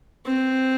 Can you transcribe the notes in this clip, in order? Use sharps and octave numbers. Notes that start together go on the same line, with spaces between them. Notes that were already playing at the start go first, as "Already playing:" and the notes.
C4